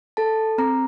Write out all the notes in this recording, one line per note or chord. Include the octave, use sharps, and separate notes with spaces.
A4 A5
C4 A#5